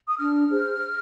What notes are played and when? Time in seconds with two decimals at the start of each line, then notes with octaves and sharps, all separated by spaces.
0.08 D#6
0.19 D4 F6
0.50 G#4 C5